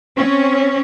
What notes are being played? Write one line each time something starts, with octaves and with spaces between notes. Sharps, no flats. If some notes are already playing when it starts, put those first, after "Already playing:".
C4 C#4